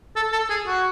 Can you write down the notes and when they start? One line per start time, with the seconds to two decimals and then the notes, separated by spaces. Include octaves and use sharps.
0.16 A4
0.32 A4
0.50 G#4
0.67 F#4